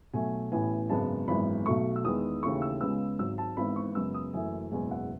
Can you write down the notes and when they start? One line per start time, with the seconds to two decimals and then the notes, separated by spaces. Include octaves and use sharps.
0.13 B1 B2 F#3 A3 G#5
0.52 A1 A2 E3 B3 G#5
0.90 G#1 F#2 C#3 G#3 B3 A5
1.28 G#1 F#2 E3 G#3 B3 B5
1.66 B1 B2 A3 C#6
1.96 E6
2.04 E2 D#3 G#3 B3 D#6
2.43 D#2 C#3 E3 A3 C#6
2.62 E6
2.81 C#2 C#3 G#3 B3 E6
3.19 G#1 G#2 F#3 E6
3.38 A5
3.57 G#1 G#2 E3 B3 B5
3.76 C#6
3.95 F#2 C#3 G#3 B3 E6
4.14 D#6
4.33 F#1 F#2 E3 A3 G#5
4.71 F#1 E2 B2 G#3 G#5
4.91 F#5